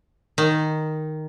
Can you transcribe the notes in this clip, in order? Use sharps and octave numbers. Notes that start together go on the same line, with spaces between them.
D#3